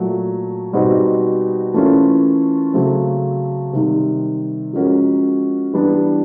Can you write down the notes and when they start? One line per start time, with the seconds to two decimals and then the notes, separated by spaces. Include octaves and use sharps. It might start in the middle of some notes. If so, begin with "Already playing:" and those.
Already playing: A#2 F#3 A3
0.73 B2 G3 C4 D#4 F#4
1.74 E3 A3 C#4 F4 A#4
2.73 C#3 F#3 A3 C4
3.73 C3 D#3 G3
4.73 F3 G#3 C#4 F#4 A#4
5.73 E3 G3 B3 D4